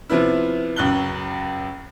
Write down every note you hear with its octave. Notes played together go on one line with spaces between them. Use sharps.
C3 F3 B3 E4
C#2 F#2 F#6 G7